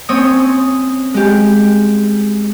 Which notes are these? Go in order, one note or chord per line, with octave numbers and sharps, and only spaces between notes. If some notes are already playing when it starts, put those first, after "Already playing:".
C4 C#4 C#5 D#6
G#3 G4